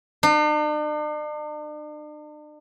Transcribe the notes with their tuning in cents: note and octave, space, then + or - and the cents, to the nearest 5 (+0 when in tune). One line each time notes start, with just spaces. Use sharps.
D4 +45